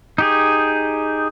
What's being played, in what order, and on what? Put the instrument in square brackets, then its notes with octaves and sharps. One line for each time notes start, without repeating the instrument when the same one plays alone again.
[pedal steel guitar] D#4 G4 G#4